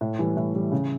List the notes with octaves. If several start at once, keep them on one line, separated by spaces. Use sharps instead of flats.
A2
E3 G3
A2
E3 G3
C#3